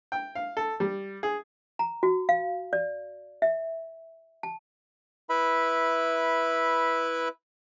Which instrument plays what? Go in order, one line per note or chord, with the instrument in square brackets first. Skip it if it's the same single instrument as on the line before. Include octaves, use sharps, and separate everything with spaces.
[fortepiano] G5
F5
A4
G3
G#4
[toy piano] A#5
F#4
F5
D5
E5
A5
[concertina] E4 B4 E5 B5